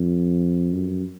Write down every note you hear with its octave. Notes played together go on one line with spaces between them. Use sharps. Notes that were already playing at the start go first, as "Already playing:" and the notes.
Already playing: F2
F#2